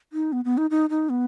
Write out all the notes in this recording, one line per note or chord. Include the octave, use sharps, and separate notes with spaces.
D#4
B3
B3
D#4
D#4
D#4
B3